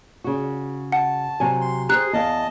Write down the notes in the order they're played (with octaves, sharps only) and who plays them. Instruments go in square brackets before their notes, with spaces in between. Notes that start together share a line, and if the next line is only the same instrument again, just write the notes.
[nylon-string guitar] C#3 F#4
[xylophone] F#5 [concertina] A5
[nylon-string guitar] C3 F#3 G#5
[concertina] C6
[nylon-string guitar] G4 C5 [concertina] G#4 [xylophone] A#5 F#6
[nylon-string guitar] E2 F5 [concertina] D#5 A5